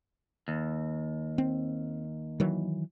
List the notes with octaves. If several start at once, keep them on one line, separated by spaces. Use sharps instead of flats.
D#2
C4
D#3 E3 F#3